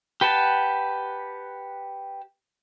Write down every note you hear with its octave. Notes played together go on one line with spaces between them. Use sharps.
G4 B4 F#5 A5